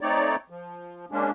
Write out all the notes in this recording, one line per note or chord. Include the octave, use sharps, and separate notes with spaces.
A3 C4 D#4 C#5 D5
F3
G#3 A#3 C#4 D4